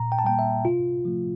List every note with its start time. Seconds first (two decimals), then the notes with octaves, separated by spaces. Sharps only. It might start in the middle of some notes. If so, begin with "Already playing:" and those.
Already playing: A#2 A#5
0.12 G5
0.19 A5
0.24 G3 A#3 G5
0.39 E5
0.65 C3 F4
1.05 F3 A3